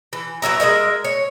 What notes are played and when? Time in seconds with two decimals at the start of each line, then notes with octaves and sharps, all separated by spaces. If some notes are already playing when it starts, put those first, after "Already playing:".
0.13 E3
0.42 B2 F#3 E5 A#5
0.60 G#3 A#4 D#5 E5
1.05 C#5